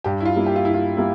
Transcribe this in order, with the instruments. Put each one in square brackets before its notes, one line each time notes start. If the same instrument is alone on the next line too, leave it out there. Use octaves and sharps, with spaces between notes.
[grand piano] G2 [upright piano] G4
[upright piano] E4
F4
[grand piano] G3 A#3 E4
[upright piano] G4
F4
[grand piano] G2 [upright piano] E4
[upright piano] F4
[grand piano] G3 A#3 E4